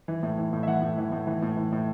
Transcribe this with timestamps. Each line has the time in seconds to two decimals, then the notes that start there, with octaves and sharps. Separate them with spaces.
0.08 E3
0.23 A2
0.38 E3
0.53 A2
0.63 E5
0.67 E3 F#5
0.82 A2
0.98 E3
1.12 A2
1.27 E3
1.42 A2
1.57 E3
1.72 A2